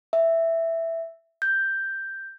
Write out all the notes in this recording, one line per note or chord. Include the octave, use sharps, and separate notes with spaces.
E5
G6